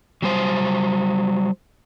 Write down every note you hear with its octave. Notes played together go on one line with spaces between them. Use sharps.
F#3 G3 C5